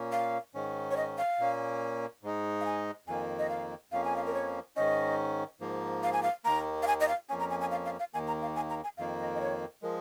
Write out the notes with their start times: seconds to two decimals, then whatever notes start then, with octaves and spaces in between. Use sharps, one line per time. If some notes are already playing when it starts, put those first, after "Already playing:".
Already playing: A#2 A#3 C#4
0.12 F5
0.54 G#2 D#3 C#4
0.91 C#5
0.97 D#5
1.18 F5
1.39 A#2 A#3 C#4
2.23 G#2 G#3 D#4
2.61 F5
2.66 G#5
3.07 F2 D#3 A#3 G#5
3.39 D#5
3.50 F5
3.91 F2 F3 A#3 C#4 F5
4.04 G#5
4.16 F5
4.26 A#4
4.34 C#5
4.76 G#2 D#3 C#4 D#5
5.61 G#2 F3 A#3
6.03 F5
6.13 G#5
6.23 F5
6.44 D#2 D#3 A#3 A#5
6.83 F5
6.87 G#5
7.01 D#5
7.08 F5
7.29 F2 F3 A#3 C#4 G#5
7.40 A#5
7.50 G#5
7.61 G#5
7.71 F5
7.85 F5
7.99 F5
8.14 D#2 D#3 A#3 G#5
8.27 A#5
8.42 F5
8.56 G#5
8.70 A#5
8.84 G#5
8.98 F2 D#3 A#3 F5
9.19 D#5
9.35 D#5
9.40 C#5
9.82 F3 G#3 A#4